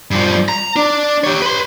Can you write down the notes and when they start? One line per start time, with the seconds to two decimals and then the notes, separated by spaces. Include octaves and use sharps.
0.11 G2 F3
0.49 A#5
0.76 D4
1.24 G4 C#5
1.42 B4 C6